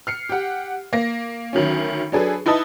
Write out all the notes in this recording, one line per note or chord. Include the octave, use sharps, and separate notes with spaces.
F6 C7 C#7
G4 F#5
A#3 A#6
D2 D#3 F#3 C#4
F#3 D4 G#4 A4 B4
D#4 E4 B4 D#5 A5 D#6